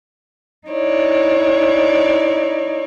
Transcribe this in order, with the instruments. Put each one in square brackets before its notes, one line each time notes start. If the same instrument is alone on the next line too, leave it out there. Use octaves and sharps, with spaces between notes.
[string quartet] D#4 E4 C#5 D5